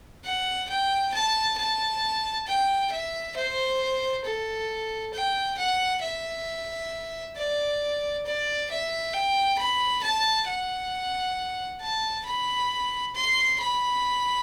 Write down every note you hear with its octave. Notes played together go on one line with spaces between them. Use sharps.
F#5
G5
A5
A5
G5
E5
C5
A4
G5
F#5
E5
D5
D5
E5
G5
B5
A5
F#5
A5
B5
C6
B5